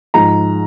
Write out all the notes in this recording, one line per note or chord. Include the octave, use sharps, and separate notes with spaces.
G#2 F3 G#3 A#5